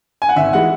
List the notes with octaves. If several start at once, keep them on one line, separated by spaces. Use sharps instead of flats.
G#5
F#5
G#1 E5
E3 G#3 F#5